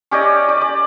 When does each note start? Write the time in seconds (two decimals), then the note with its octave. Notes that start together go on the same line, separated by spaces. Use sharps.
0.11 C#4 G4 D5 D#5
0.49 D5
0.61 D5